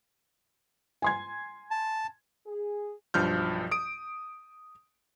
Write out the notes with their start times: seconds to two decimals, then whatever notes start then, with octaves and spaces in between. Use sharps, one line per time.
1.02 G#5 C6 G#6
1.71 A5
2.46 G#4
3.14 B1 G2 F3 F6 G6
3.71 D#6 D7